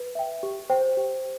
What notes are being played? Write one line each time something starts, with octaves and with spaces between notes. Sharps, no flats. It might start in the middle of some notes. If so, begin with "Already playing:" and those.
Already playing: B4
E5 G5
G4
C5 G5
G4